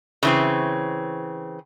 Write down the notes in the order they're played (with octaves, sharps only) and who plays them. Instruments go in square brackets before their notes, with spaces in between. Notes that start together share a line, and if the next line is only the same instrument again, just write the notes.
[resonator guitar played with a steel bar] C#3 E3 C4